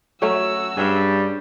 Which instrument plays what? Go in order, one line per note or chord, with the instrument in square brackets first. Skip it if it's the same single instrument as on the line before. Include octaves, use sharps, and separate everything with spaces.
[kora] F#3 A3 C#4 [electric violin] F#4 E6
[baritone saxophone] G2 [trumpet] G3 [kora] G#4 C#5